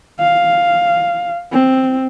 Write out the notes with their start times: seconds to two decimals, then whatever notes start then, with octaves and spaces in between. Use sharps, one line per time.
0.19 F5
1.52 C4